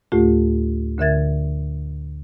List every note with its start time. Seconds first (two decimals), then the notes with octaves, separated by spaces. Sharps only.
0.12 D2 A2 A3 F4 G4
0.99 D2 D3 A#4 E5 G#6 A6